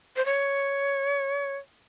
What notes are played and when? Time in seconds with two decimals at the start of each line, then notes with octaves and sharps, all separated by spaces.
0.16 C5
0.25 C#5